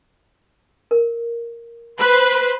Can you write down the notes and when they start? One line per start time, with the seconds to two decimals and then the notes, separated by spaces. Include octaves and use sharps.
0.91 A#4
1.98 B4 C5